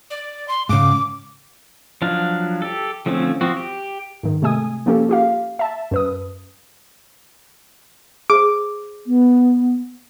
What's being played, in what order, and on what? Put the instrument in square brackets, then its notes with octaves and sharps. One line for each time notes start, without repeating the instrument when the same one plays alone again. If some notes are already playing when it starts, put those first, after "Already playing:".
[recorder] D5
C6
[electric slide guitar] G#2 C#3 [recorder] D6
[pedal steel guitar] F3 F#3 D4 F5
G4 A4
D3 F3 A3 C4 C#4
F3 C4 F#4
G4
[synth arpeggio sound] G#2 D#3
C3 G#3 A3 G#5 D#6
F3 A#3 C#4 G4 A4
F4 G4 F5
E5 A5
F#2 B4 D#6
[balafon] G#4 C5 [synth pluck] D6
[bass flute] B3